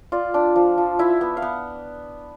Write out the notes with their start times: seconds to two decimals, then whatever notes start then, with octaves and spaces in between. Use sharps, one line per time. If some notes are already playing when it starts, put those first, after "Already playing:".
0.12 F4 D5
0.34 D4
0.56 F3
0.78 F3
0.99 E4 E5
1.21 B3
1.37 F5
1.42 B3 F#5